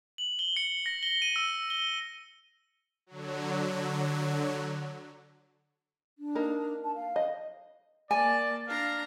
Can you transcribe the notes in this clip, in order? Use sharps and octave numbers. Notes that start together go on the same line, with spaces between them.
F#7
G7
C#7
A#6
G7
D#7
E6
G7
D3 F#3
D4
A#3 D#4 A#4
A5
F5
D#5
A#3 D5 G#5 A5
D4 F5 A#5